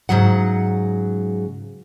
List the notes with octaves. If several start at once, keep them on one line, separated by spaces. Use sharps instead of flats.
G#2 C#3 F#3 F#5